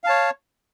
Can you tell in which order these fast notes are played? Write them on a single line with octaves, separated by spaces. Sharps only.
F5 A5 C#5